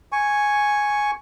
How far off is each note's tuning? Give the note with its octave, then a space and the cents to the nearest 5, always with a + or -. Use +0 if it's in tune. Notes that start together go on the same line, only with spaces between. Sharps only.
G#5 +0 C#6 +0